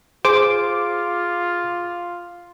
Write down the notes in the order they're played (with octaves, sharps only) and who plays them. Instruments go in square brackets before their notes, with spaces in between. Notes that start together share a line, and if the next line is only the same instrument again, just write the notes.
[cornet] F4 [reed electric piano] G#4 [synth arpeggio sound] C5 [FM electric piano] D6